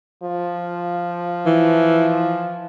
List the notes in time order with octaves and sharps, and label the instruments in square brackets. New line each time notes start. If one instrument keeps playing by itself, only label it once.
[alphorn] F3
[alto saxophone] E3